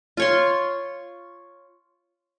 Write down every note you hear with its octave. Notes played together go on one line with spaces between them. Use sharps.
F4 C#5 C6